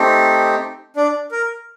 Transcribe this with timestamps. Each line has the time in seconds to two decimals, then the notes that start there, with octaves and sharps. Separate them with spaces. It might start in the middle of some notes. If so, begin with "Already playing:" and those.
Already playing: A3 C4 D#4 G4
0.96 D4 D5
1.32 A#4